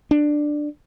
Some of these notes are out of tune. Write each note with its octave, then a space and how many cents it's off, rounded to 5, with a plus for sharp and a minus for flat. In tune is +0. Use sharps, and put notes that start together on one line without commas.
D4 +10